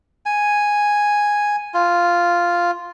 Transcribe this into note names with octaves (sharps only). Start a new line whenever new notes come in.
G#5
F4